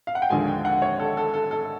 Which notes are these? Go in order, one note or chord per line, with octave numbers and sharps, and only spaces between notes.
F5
F#5
G5
D#2 D3 F3 G#3 G#5
G5
F#5
C#5
A4
A4
A4
A4